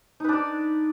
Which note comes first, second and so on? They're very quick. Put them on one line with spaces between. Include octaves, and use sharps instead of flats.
D#4 B4 D4 D5